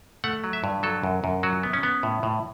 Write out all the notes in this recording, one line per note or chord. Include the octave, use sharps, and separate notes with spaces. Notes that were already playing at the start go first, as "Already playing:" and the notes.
A3 F#5
F#3
E5
G2
F#3 A4
F#2
F#2
F#3 F#4
B3
C#4
B3
A2
A2